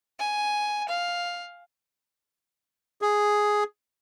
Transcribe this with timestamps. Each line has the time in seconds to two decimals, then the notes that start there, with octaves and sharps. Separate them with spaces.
0.19 G#5
0.89 F5
3.02 G#4